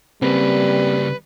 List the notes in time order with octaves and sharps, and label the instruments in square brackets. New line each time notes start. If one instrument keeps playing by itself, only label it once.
[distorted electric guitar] C#3 A#3 [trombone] G3 [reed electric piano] C4 [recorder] B4